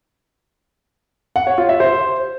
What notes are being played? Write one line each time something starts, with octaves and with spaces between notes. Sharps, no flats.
F#5
C#5
F4
E5
C5